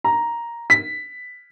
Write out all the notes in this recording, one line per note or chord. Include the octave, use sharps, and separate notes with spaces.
A#5
B6